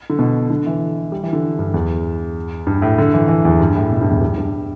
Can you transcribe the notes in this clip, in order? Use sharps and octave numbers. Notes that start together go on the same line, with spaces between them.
D3
B2
D3
E3
G3
E3
D3
G2
E2
G2
A2
D3
E3
E3
E2
G2
A2
B2
G2
E2
G2
G2